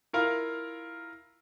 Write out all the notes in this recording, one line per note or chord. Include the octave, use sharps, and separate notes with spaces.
E4 F4 A#4 F5